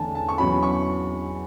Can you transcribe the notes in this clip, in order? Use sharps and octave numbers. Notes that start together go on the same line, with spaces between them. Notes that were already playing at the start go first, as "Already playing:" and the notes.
Already playing: E2 D3 A3 C#4 G#5 A5
A5
C#6
E2 B2 F#3 C#4 B5
C#6